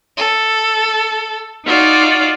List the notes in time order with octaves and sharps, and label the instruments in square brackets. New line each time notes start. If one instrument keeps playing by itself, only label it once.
[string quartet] A4
D#4 F4 F#4 D5